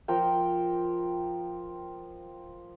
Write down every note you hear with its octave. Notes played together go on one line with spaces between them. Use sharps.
F3 A#4 G5